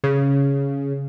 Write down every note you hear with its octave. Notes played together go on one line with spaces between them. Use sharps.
C#3